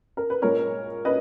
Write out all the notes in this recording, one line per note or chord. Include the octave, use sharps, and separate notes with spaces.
A#4
B4
A#2 G#3 A#4 C#5
B4 D#5